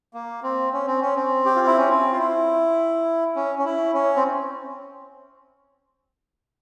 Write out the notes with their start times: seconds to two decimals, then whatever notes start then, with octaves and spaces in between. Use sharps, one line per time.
0.14 A#3
0.43 C4
0.73 C#4
0.87 C4
1.01 C#4
1.16 C4
1.45 G4
1.56 F4
1.66 E4
1.78 C#4
1.90 C4
2.13 F4
2.19 E4
3.36 C#4
3.59 C#4
3.65 E4
3.94 C#4
4.16 C4